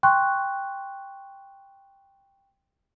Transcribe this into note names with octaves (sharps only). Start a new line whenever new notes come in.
G5 C6 C#6 F#6